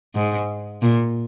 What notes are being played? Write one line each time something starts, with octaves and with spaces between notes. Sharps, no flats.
G#2
A#2